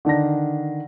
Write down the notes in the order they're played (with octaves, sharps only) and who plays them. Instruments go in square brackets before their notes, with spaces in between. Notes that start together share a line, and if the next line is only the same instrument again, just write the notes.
[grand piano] D3 D#3 D4 A#6